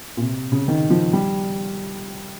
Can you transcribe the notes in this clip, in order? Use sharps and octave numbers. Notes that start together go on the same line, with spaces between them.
A#2
C3
C#3
D#3
F3
G3